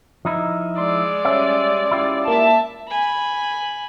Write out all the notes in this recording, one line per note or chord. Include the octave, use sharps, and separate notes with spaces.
F3 D#4 E4
G#3 D5 C6
G3 C#4 E5
E4 F4 G4
A#3 E5 A5
G#5 B5